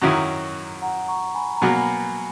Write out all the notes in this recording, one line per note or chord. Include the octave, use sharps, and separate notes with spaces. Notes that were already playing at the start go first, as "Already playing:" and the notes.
F#2 D#3 F#3 C#4 E4 A#5 C#6
F#5 A#5
A#5 C#6
G#5 B5
A#5
B2 F#3 A#3 G#5 B5
G#5